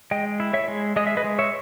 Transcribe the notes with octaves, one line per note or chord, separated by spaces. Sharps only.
G#3 D#5 G5
E4
C#5 E5
G#3
G#3 D#5
E5
B4 D#5
G#3
C#5 E5